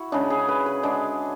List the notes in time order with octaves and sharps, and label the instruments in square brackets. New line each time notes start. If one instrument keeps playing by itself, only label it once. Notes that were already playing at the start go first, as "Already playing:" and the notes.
Already playing: [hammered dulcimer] E4 F#4
C#3 G#3 D4
G#4
B4
B4
D3 G#3 D5